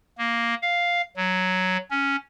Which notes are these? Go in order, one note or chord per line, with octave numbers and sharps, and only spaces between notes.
A#3
F5
F#3
C#4